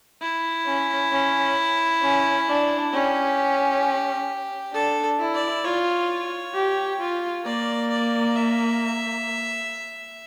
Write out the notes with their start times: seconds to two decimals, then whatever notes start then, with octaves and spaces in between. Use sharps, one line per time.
0.21 E4
0.66 C#4
1.12 C#4
2.02 C#4
2.48 D4
2.93 C#4 G4
4.74 D4 A4
5.20 E4
5.34 D5
5.64 F4 C#5
6.55 G4
7.00 F4
7.45 A#3 D5
7.91 D5
8.36 E5